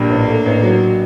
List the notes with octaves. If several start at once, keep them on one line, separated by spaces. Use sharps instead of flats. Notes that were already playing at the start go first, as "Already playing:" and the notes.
Already playing: A#1 G3 A#3 D4
A1
A3
A1
F#3